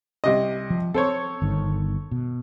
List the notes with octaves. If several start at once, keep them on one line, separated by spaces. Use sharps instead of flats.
C2 C3 D#5
F3
C4 A4 C5 C#5
G1 D#3
B2